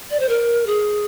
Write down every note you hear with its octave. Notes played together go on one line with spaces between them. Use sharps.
D5
C5
A#4
G#4